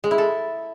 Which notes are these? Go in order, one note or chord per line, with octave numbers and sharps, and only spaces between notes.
G#3
E4
A4